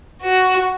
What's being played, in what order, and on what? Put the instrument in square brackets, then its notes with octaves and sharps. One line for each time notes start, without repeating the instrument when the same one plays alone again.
[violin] F#4